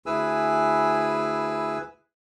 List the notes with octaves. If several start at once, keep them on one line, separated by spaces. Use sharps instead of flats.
D2 E4 G#4 B4 G#5 E6